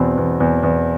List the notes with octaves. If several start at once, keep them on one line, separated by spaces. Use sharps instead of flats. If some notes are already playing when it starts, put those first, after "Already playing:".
Already playing: E2 B2 C4
E2
E2
E2